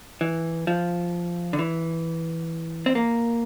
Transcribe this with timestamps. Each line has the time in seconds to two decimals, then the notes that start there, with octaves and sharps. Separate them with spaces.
0.21 E3
0.67 F3
1.53 D3
1.59 E3
2.86 C4
2.95 A#3